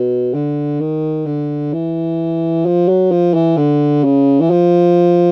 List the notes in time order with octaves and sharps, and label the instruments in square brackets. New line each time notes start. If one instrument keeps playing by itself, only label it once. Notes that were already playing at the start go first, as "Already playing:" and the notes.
Already playing: [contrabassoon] B2
D3
D#3
D3
E3
F3
F#3
F3
E3
D3
C#3
E3
F3